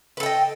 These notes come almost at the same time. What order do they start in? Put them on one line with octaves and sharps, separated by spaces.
B4 A4 G5 D#5